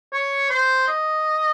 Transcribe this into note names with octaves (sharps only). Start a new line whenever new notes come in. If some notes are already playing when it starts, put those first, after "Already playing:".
C#5
C5
D#5